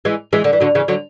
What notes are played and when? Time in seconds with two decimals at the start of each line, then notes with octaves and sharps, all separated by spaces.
0.05 E3 G#3
0.33 E3 G#3
0.44 D3
0.53 E3
0.60 D3 F#3
0.75 C#3 E3
0.88 D3 F#3